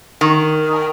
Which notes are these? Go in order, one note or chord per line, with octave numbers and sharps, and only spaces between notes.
D#3